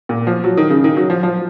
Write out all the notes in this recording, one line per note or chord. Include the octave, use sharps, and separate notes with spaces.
A#2
F3
F#3
D#3
C#3
D#3
F#3
F3
F3